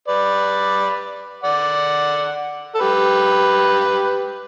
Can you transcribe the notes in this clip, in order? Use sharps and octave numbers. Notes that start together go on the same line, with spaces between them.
B4 D5
D5 F#5
A4
G4 B4